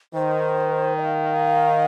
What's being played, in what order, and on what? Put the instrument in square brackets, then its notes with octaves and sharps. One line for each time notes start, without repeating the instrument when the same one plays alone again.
[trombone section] D#3 [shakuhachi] C5
[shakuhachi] D#5
F5